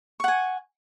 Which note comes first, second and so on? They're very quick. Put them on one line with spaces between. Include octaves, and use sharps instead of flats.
C#6 F#5 G#5